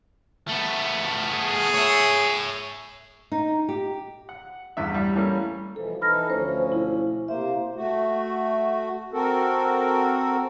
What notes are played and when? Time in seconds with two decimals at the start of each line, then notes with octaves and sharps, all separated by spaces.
0.48 A3 B3
1.31 G#4
1.74 C#5 E5
3.32 D#4
3.69 G4
4.29 F#5
4.77 A1 E2 G2 E5
4.94 G3
5.15 E3 G3 A3 A#3 C#4
5.76 B2 E3 F3 A4
6.01 E3 D#4 A4 B5 F6 A#6
6.28 D2 F3 C#4 A4 B4 C5
6.70 B2 E4
7.28 C3 A#3 C5 E5
7.76 A3 F#4
9.13 C4 F#4 A4 A#4